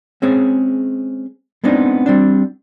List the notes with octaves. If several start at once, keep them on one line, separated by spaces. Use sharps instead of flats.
G#3 C4 C#4 G#4
G#3 B3 C4 D4 D#4
G3 C4 D4